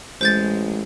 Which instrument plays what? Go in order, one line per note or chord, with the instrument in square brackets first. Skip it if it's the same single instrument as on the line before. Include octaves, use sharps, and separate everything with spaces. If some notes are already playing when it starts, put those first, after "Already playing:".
[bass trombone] A1 [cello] G#3 [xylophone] C5 G6 A6